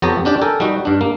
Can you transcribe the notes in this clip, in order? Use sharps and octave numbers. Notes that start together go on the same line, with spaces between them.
F2 B3 G4 C#5 A5 A#5
C#4 D4 G4 D5
A4 A#4 G5 G#5
G3 D#4 F#4
G2 D4
A#3